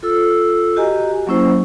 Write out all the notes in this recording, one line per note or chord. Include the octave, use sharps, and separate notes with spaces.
F4 A4 E6
F#4 G4 D#5 G#5 A#5
F#3 A#3 C#4 E4 C5